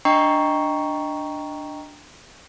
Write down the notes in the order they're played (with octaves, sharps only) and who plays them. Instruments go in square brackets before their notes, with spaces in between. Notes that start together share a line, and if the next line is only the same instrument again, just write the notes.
[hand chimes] D4 D#5 G5 A#5 C#6 C7